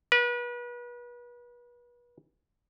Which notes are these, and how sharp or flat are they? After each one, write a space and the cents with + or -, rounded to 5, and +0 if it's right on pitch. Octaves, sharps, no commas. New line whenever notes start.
B4 -35